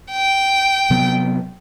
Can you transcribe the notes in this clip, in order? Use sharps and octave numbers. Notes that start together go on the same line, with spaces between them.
G5
C3 F#3 B3